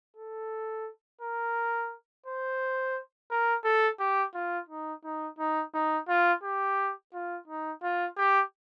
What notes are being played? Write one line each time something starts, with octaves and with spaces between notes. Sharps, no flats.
A4
A#4
C5
A#4
A4
G4
F4
D#4
D#4
D#4
D#4
F4
G4
F4
D#4
F4
G4